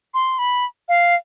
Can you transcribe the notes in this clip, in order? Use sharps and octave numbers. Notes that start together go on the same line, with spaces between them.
C6
B5
F5